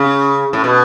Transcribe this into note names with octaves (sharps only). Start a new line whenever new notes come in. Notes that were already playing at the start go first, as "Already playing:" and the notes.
Already playing: C#3
A2
B2